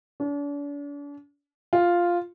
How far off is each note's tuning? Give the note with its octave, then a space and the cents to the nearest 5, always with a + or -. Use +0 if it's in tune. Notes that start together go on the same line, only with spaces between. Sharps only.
D4 -40
F4 +0